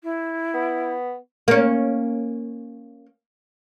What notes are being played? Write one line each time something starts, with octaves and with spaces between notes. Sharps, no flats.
E4
B3
A#3 C#4